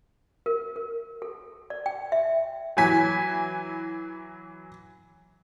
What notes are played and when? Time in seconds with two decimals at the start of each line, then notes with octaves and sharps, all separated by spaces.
0.46 A#4
0.76 A#4
1.22 A4
1.70 D5
1.86 G5
2.12 E5
2.77 E3 F#3 G#5 B6